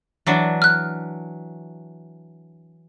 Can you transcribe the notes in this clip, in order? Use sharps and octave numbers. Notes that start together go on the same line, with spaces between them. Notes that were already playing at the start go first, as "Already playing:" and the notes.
E3 F#3 D4
F6 F#6